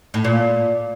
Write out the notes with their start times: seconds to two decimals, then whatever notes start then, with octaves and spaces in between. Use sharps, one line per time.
0.14 A2
0.25 A#2